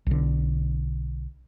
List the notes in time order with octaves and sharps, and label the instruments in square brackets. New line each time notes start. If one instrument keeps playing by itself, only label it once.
[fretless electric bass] B1 D3